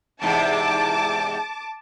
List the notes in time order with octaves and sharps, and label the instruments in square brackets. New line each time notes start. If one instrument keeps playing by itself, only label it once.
[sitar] E2 G#2 C3 [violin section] A5 D6